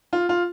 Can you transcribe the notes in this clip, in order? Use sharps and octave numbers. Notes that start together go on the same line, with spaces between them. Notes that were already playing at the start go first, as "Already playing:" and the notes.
F4
F4